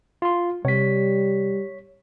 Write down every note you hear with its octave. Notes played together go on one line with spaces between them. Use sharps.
F4 C6
C3 G3 C#5 B6